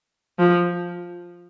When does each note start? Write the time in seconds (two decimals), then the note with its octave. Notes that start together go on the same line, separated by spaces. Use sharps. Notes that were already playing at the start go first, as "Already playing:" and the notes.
0.39 F3